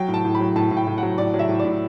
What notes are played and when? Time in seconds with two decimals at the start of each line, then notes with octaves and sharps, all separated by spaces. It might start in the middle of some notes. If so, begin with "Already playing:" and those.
Already playing: F#3 G5
0.08 A2
0.14 A5
0.25 A2
0.35 B5
0.40 F#3
0.56 A2 A5
0.71 A2
0.77 G5
0.87 A2
0.98 F#3 F#5
1.18 A2 D5
1.34 F#3
1.39 E5
1.49 A2
1.59 D5
1.65 A2